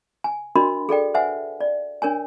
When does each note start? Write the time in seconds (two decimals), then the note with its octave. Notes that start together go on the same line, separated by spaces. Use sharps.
0.24 G#5
0.55 D4 F#4 A#4 D#5 B5 C6
0.89 G#4 A4 D5 G5
1.14 B4 C5 E5 F#5 G#5
1.60 D5
2.02 D4 A#4 C#5 G#5